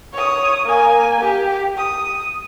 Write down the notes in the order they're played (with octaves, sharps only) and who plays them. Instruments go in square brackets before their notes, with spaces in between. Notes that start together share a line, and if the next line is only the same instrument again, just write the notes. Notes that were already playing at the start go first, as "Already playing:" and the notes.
[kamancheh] C#5 D#6
A#3 G#5
G4
D#6